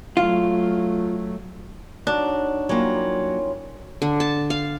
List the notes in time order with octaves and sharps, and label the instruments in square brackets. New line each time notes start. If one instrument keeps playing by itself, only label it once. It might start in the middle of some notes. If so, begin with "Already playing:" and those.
[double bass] F#3 A3 [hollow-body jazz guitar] F4
[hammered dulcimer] F#3 D#4 [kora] D4
[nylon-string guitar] F#3 A#3 [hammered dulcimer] G3 C#4 F4
[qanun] D3
A5
F5